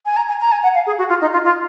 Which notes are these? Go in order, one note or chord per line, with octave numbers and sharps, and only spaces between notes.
G#5
A#5
G#5
A#5
G#5
F#5
F5
G#4
F#4
F4
D#4
F4
F4